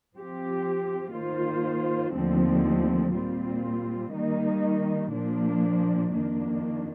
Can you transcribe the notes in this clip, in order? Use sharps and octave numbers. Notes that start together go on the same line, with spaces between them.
F3 C4 G4
D#3 A#3 F4 C5
D#2 D3 F3 A3 C4
A#2 G3 C4 F4
D#3 G3 A#3 D#4
A#2 F3 A#3 D4
F2 D#3 A#3 D4